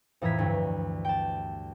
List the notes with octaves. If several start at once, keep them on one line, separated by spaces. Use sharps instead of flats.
F2 A2 E3 A#5 G#6 B6
D2 G2
G5 A5